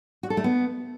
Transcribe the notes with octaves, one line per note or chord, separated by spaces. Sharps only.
F#4
A4
A3
B3